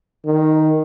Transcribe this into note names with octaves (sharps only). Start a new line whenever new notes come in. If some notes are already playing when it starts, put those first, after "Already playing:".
D#3